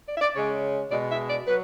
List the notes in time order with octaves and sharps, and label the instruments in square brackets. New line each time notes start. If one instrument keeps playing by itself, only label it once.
[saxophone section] D5
E5
D5
C#3 G#3 C#5
B2 G#3 D5
E5
D5
F#3 B4